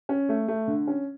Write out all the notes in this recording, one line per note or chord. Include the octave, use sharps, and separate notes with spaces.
C#4
A3
A3
D3
C#4